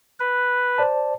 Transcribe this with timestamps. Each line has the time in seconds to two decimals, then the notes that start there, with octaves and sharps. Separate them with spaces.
0.20 B4
0.78 C5 D5 A5